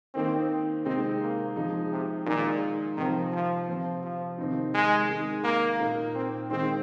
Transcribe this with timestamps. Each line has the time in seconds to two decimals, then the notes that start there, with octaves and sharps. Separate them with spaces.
0.14 D#3 A#3 C4 D#4
0.85 C3 G#3 C4 D#4
1.21 A#3
1.56 F3 G#3 D#4
1.91 C3
2.26 A#2 D#3 G#3 D#4
2.96 C3 D#3 F3 C4
3.32 F3
3.68 C3 F3 C4
4.03 F3
4.38 C3 D#3 C4 D#4
4.74 G#3
5.09 D#3 G#3 D#4
5.44 A#3
5.80 A#2 A#3 D#4
6.15 C4
6.50 D#3 G#3 C4 D#4